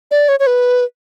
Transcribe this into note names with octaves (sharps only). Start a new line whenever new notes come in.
D5
C#5
C#5
B4